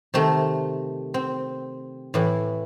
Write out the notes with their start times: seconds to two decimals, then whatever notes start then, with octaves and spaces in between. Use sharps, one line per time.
0.14 C3 D#3 A3
1.14 C4
2.14 A2 E3